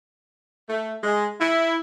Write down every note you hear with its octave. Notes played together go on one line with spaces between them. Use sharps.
A3
G#3
E4